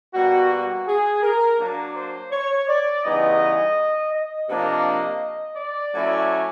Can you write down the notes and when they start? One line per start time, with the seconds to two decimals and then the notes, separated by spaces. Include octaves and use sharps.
0.14 B2 G3 A#3 F#4
0.51 F#4
0.87 G#4
1.23 A#4
1.58 F#3 A#3 D4
1.95 C5
2.32 C#5
2.68 D5
3.04 C#3 E3 G3 B3 D#4 D#5
4.12 D#5
4.49 C3 F3 A#3 D4
5.57 D5
5.93 F#3 A3 C#4 E4